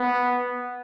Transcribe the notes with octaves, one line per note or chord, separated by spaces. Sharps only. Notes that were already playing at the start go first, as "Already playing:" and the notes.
Already playing: B3